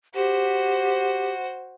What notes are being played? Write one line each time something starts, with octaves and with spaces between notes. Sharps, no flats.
F#4 G4 C5